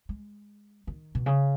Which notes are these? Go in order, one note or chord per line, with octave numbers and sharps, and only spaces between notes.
G#3
D#3
B2
C#3